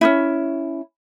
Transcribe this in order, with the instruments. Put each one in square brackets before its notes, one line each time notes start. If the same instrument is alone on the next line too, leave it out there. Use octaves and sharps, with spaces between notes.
[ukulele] C#4 D#4 E4